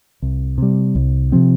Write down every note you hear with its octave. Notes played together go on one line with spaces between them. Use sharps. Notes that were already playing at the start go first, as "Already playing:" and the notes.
C2
C3 G3
C2
C3 F3 C4